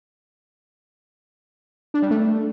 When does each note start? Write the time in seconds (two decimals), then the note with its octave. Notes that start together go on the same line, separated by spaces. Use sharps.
1.94 D4
2.02 G3
2.11 A3